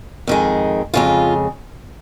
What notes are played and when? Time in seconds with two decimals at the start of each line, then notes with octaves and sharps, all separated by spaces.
0.27 F2 D#3 G#3
0.94 F2 C#3 G#3 F4